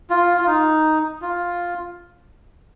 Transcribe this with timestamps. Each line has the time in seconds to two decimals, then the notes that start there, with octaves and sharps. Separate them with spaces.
0.10 F4
0.37 F4
0.47 D#4
1.22 F4